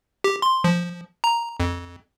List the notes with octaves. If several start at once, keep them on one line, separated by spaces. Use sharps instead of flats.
G4
C6
F3
A#5
F2